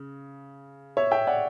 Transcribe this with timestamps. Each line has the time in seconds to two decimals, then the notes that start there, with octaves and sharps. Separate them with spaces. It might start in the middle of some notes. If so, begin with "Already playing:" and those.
Already playing: C#3
0.97 C#5 E5
1.11 E5 G5
1.27 D5 F#5